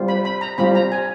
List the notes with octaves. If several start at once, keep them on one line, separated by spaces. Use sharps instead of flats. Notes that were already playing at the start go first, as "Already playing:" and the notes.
Already playing: G3 C4 F4
B5
B5
A#5
G3 C4 F4 B5
A#5
G#5